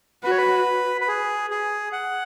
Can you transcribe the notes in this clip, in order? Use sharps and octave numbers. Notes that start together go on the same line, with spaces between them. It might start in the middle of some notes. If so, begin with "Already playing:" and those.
F#4 B4
C#5
B4
B4
G#4
G#4
F#5